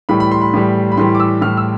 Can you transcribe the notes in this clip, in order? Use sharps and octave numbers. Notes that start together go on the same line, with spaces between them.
A2 E3 G3 B5
B5
C6
B5
A2 E3 G3
B5
A2 E3 G3 C6
D6
E6
A2 E3 G3 F6
E6